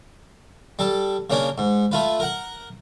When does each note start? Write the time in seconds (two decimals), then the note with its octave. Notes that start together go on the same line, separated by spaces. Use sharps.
0.79 G3 A4
1.30 C#3 A#3 C#4 D4
1.58 G#2
1.92 A3 F4 B4
2.20 A#4 F#5